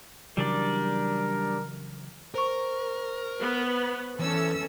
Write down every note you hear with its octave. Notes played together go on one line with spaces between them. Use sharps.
C#3 E3 F#3 G3 D4 A#4 D5
A#4 C5 C#6
B3
E2 E3 C#4 A4 E6